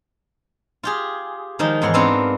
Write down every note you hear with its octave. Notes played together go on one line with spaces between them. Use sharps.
F4 G4 G#4
D#3 F3 G#3 D#4
E2 G#2 C#5 F#5 C6
B3 C4 D4 F4 A#4 F5